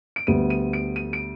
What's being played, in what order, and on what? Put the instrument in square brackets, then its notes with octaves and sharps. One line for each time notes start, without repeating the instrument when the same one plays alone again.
[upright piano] D7
D2 D3 G3 B3 D#7
D#7
D7
D#7
D7